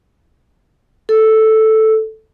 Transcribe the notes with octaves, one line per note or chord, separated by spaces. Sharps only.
A4